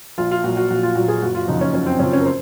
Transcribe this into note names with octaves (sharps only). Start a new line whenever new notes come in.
A#1 F4
F4
A#2 F#3 F#4
F#4
A#1 F#4
F4
A#2 F#3 F#4
G#4
F#1 F#4
F4
F2 C#3 F3 D#4
C#4
F#1 C#4
C4
F2 C#3 F3 C#4
C#4
A#4
C5